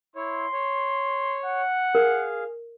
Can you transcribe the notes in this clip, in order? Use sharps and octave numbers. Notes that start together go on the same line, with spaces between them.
E4 C#5 C6
C#5
F#5
G#4 A#4 F5